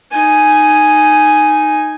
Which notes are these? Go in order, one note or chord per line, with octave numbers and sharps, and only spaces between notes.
D#4 G#5